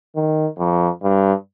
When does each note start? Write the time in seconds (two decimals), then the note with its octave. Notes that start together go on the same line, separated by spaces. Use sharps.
0.16 D#3
0.58 F2
1.03 G2